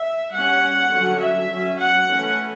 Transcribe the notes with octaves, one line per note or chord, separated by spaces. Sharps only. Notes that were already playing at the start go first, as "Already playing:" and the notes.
Already playing: E5
G3 C#4 F#5
D3 F#3 C#4
E5
F#3 C#4
F#5
E3 A3 C#4